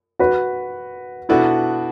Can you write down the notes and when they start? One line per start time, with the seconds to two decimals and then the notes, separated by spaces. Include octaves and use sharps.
0.19 F#4 B4
1.29 B2 B3 D4 E4 F#4 A4